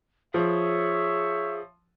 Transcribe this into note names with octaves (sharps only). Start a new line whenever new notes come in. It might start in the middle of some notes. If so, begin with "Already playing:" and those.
F3 G#4 C#5 E5